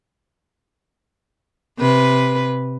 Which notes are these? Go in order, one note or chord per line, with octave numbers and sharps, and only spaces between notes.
C3 B4